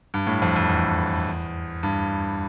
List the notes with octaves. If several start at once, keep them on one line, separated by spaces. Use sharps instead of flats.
G2
A2
F2
F2
E2
G2